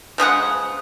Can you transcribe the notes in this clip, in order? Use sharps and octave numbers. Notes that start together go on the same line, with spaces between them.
C#3 F3 G#3 F#5